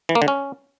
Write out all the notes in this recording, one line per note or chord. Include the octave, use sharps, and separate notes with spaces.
E3
A#3
D3
C#4